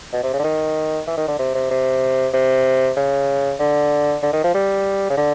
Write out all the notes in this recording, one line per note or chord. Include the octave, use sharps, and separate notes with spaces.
B2
C3
C#3
D3
D#3
E3
D#3
D3
C3
C3
C3
C3
C#3
D3
D3
D#3
F3
G3
C#3
D3